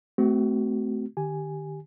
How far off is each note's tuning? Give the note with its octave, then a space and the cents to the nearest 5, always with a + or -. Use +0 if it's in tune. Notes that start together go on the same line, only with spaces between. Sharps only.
A3 -15 C4 -30 F#4 +30
D#3 -40 G4 +0 G#5 +0